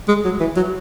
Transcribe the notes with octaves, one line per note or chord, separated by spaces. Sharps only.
G#3
F#3
E3
F#3